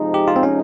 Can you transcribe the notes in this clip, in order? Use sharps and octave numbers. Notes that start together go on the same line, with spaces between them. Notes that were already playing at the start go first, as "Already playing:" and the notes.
Already playing: C3 F3 G#3 D#4
G4
F4
C4
C#4